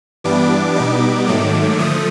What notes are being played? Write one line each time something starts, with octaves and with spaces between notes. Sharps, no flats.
G2 E3 G3 B3 D4 D6
B2 G3 B3 D#4 D6
G#2 D#3 F#3 A3
D3 F3 A3 D#6